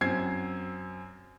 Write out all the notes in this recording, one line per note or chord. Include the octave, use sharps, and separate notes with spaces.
F#2 C4 G#6 C7